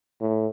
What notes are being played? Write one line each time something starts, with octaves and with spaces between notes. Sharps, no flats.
A2